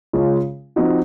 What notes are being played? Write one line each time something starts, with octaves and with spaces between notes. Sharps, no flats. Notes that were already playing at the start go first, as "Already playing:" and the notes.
C#3 G#3 C#4 F4
F3 C4 D#4 F#4